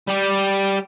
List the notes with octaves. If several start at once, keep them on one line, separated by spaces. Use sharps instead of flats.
G3 G4